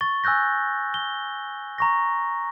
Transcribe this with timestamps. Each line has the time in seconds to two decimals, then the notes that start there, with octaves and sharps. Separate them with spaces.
0.01 C#6 A6 G7
0.24 G#5 E6 F#6 G6 A#6
0.94 G7
1.78 A#5 C#6 A#6